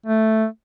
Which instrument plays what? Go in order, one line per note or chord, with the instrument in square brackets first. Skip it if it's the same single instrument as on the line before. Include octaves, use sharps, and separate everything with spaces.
[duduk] A3